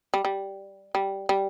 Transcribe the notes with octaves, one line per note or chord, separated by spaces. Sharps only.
G3
G3
G3
G3